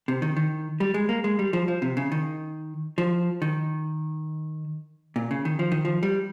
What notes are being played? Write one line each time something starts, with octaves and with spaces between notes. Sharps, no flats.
C3
D#3
D#3
G3
G#3
A#3
G#3
G3
F3
F3
C3
C#3
D#3
F3
D#3
A#2
C#3
D#3
F3
D#3
F3
G3